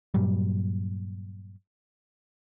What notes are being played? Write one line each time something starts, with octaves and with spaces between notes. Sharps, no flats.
G2 A#2 F#3 G3